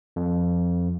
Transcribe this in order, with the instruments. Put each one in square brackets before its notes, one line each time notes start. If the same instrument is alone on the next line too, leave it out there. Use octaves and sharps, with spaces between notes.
[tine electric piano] F2